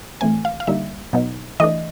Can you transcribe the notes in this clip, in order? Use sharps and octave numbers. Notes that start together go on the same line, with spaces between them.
A2 E3 A3 C4 G#5
F5
F5
D3 G3 A#3 D#4 E5
B2 F#3 B3 D#4
E3 A3 D4 D#5